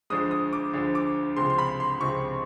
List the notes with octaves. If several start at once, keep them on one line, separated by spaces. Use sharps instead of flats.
D2 D3 F3 G#3 D#6
D#6
D6
D2 D3 F3 G#3
D6
C#2 C3 F3 G#3 C6
C6
B5
C6
C#2 C3 F3 G#3 C#6